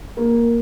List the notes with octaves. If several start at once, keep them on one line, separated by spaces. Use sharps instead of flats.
A#3